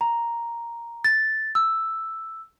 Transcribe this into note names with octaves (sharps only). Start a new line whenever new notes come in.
A#5
A6
E6